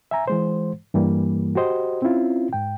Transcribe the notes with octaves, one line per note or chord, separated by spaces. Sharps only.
E5 G#5 A#5
E3 G#3 C5
G2 E3 G3 A#3
F#4 G4 C5 D#5
C4 C#4 E4 F4
G#2 G5